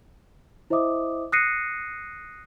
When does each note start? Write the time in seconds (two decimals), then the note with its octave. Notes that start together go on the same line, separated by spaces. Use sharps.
0.70 E4 C5 D#5 E5 D6 D#6
1.32 D#6 F#6 A#6 C7 C#7 D#7